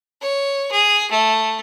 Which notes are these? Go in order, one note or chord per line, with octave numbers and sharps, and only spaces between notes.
C#5
G#4
A3